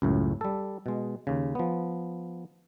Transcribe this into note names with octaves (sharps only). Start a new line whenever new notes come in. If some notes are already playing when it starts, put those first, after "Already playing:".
C#2 F#2 A2
G3 A4
B2 G#3
D#2 C#3
F3 B3